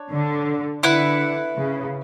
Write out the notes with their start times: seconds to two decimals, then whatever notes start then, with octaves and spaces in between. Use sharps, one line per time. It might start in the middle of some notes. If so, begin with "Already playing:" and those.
Already playing: D4 C#5
0.10 D3
0.83 D3 E4 B4 F#5
1.57 C#3